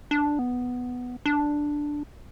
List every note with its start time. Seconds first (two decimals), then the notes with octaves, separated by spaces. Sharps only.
0.11 D4
0.39 B3
1.26 D4